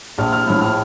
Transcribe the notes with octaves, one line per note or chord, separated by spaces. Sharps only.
A#1 F6
F6
A2 F3 F6
F6